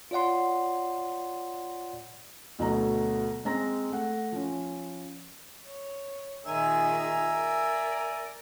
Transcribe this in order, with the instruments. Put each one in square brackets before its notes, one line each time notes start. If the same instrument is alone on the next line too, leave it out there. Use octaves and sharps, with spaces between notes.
[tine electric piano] F4 C#5 D5 F#5 C6
[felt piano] D2 B2 F#3 A3 A#5
G#3 C4 A#5 A#6
A3 F#5
F3 C#4
[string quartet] C#5
[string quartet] A#2 D#3 G#3 [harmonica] E5 G#5 A#5
[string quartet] A#4 D5